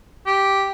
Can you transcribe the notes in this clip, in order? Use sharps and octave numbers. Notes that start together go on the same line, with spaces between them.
G4